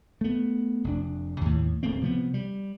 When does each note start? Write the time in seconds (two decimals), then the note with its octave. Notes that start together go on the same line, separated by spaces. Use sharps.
0.21 A3 B3
0.84 F1 D4
1.41 D#2 A2
1.83 D1 A3 A#3 C4
2.01 C3 F3 G3 B3
2.34 G3